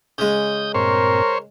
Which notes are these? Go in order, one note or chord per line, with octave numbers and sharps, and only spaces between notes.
C#3 G#3 D#6 G6
G2 A#2 C4 A#4 C5 C#5